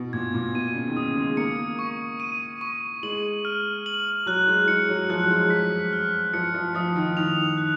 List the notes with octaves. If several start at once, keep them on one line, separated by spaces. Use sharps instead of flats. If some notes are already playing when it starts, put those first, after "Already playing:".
Already playing: B2
A#2 G#6
A#2
B2 D#7
C#3
D#3
C#3 D#6
G#3
A#3 C#7
C#6
D#7
C#6
G#3 F#7
F6
F#7
F#3 F#6
G#3
G#3 C#7
F#3
F3 F#6
F#3
G#3
F#3 B6
F6
F3 C#7
F3
F3 D#6
D#3
D#3 F7
F#6